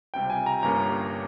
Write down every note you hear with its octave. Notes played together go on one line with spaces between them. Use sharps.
C#2 C3 G3 G5
G#5
A#5
G1 G2 G3 A#3 C#4 A#5